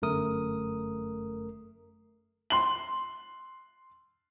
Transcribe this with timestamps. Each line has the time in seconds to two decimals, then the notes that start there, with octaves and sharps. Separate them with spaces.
0.02 G1 F#2 A3 A#4 D#6
2.50 C6 F#7